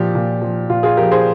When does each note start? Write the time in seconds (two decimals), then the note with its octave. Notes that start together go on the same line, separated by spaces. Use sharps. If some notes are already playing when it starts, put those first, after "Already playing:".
Already playing: A#2 F3 G4
0.15 A#2
0.42 F3
0.70 A#2 F4
0.83 F4 G#4
0.97 F3 G4 A#4
1.11 G#4 C5